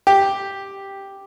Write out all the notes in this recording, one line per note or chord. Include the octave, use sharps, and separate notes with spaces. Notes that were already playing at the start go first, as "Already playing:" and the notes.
G4